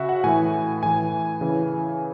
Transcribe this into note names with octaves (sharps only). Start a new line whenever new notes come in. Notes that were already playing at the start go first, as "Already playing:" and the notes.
Already playing: C#3 F#4 E5
F#5
A2 E3 G#5
A2 E3 G#5
C#3 E3